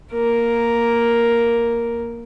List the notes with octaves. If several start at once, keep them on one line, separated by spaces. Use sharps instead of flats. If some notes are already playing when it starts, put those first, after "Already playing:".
A#3 A#4